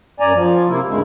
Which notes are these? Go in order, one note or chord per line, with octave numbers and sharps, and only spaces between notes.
F#2 D5 G#5 A#5
F3
C3 A#3 E4
D2 G2 C#3 G#3 E4